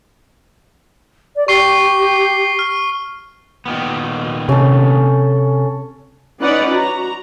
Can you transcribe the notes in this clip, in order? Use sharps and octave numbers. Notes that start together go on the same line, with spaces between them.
D5
G4 C#6 C7 G7
F6
A#2 D#3 B3
C3 C#4 A4
C#4 D#4 B4 D5 F#5
F#4 A#5